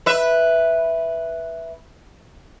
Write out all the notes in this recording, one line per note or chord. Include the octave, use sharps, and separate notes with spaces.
B4 E5